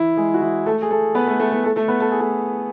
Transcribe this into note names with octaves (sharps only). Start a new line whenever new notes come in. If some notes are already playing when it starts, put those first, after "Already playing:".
Already playing: E3 E4
G#3 G#4
F#4
E3 E4
A3 A4
G#4
A3 A4
B3 B4
A3 A4
A3 A4
B3 B4
A3 A4
A3 A4
B3 B4
A4
G#4
A3 A4